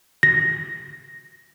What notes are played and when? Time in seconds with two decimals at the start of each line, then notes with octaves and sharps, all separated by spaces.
0.23 A#6